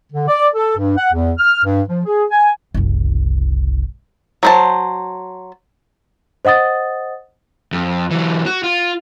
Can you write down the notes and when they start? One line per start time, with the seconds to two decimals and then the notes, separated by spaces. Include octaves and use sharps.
0.12 D3
0.28 D5
0.55 A4
0.78 G2
0.98 F#5
1.13 E2
1.38 F6
1.64 G2
1.89 F3
2.05 G#4
2.31 G#5
2.74 F#1 C2
4.43 F#3 C5 A5
6.45 C5 D#5 F#5 D#6 A6
7.73 F2
8.11 E3 F#3
8.46 F#4
8.63 F4